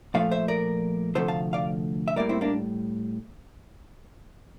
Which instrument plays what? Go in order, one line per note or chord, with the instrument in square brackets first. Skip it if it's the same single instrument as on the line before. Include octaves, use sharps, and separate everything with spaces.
[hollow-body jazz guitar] A#2 F3 A3 D5 F5
C5 E5
A#4 D5
D2 C3 F3 A3 A4 C5
F5 A5
D5 F5
E5
A2 G3 A#3 A#4 D5
C4 E4
A#3 D4